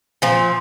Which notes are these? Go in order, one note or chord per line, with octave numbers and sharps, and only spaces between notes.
A#2 F3